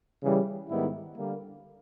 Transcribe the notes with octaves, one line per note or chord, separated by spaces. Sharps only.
C#3 E3 G3
G#2 D#3 G3 B3 E4
D3 G3 A#3